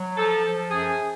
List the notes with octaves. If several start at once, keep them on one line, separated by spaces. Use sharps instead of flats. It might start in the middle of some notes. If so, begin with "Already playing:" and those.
Already playing: F#3
F3 A4
F3
F#2 G#4